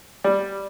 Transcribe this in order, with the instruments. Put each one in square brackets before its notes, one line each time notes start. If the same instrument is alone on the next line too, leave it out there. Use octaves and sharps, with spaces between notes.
[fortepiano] G3